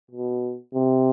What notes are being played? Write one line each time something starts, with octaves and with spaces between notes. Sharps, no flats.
B2
C3